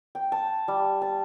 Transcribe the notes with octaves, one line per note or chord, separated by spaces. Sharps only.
G5
A5
G3
A5